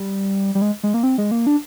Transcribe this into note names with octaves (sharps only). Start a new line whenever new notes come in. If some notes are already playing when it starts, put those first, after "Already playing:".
Already playing: G3
G3
G#3
G#3
A#3
C4
G#3
A#3
D4